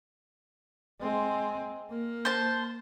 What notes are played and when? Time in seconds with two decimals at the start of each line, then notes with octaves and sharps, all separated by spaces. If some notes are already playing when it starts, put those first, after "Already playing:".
1.00 G#3 C4
1.90 A#3
2.25 C5 A5